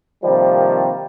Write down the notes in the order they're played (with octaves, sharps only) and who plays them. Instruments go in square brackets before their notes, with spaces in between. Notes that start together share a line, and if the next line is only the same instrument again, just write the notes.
[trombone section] C3 D#3 F3 G3 A#3 C4